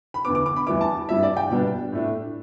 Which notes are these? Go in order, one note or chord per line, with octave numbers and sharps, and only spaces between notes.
B5
E2 D3 B3 D6
D6
D6
B5
E2 E3 G3 B3 E4 D6
A5
G2 G3 E4 E5
D5
G5
B2 G3 B3 D4
A2 A3 D4